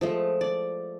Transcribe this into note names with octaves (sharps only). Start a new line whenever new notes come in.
F3 G#3 A3
D5